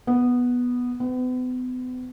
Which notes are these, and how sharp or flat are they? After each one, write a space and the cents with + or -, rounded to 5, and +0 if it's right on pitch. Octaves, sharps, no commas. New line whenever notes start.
B3 -5
B3 +40